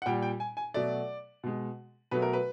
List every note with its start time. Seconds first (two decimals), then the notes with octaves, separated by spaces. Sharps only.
0.02 F#5
0.06 A#2 G3 G5
0.22 G5
0.40 G#5
0.57 G#5
0.74 B2 F#3 A3 D5
1.43 B2 G#3
2.11 B2 F#3 A3 B4
2.22 A#4
2.33 B4